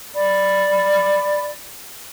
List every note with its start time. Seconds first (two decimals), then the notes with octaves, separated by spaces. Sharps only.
0.15 D5 B5